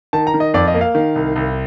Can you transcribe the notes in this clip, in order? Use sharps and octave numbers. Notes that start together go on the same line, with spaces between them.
D#3 A5
A#5
D#3
D#5
F2 D5
D#5
A#3
F5
D#3
C2
C2